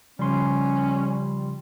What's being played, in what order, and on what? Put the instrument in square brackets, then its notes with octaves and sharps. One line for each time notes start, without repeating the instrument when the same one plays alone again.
[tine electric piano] C#3 F3 C6 [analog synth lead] G3 [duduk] C#4